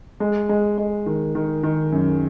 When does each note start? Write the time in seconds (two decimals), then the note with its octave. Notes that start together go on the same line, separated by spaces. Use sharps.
0.20 G#3
0.49 G#3
0.78 G#3
1.06 D#3
1.35 D#3
1.63 D#3
1.92 F#2